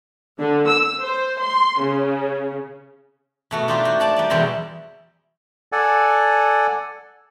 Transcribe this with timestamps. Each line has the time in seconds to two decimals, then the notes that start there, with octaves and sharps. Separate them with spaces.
0.39 D3
0.68 E6
1.01 C5
1.41 C6
1.80 C#3
3.51 B2 A3 F#4
3.68 D4 D#4 F4 G4 C5
3.85 F#4
4.00 D4 D5 A5
4.16 G3 D#4 D5
4.30 E2 B2 G3 C5 E5 A#5
5.72 A4 D5 F#5 G#5